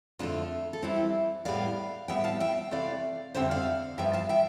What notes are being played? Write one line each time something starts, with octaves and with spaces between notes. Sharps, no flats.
F2 D3 A3 D4 F4
A4
F2 E3 G3 C4 E4 G4
A2 G3 B3 D5 F5
A2 G3 B3 E5 G5
F5 A5
E5 G5
C3 E3 A3 D5 F5
F2 D3 G3 C4 C5 E5
D5 F5
G2 F3 B3 E5 G5
F5 A5
E5 G5